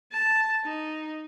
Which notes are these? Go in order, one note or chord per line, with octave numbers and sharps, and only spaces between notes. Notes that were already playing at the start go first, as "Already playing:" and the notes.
A5
D#4